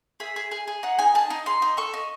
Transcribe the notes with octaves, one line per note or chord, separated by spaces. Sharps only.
G#4 E5
G#4
G#4
G#4
D#4 F#5
D#4 G#5
G#4 A5
D#4
D#4 C6
D#4
A4 C#6
D#4